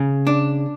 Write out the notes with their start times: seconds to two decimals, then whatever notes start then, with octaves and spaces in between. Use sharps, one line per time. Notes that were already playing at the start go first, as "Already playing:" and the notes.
Already playing: C#3
0.27 D4